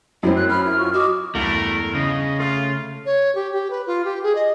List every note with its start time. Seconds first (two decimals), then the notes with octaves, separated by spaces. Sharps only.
0.23 F#2 F#3 C4 E4
0.36 F#6
0.49 B5 F6
0.63 E4
0.78 F4 F#4 C#6
0.94 F#4 D#5 D6 D#6
1.35 E2 G2 A3 A#4
1.95 C#3 D#5
2.39 A3 F4 F6
3.06 C#5
3.35 G4
3.52 G4
3.70 B4
3.87 F4
4.05 G4
4.23 G#4
4.35 D#5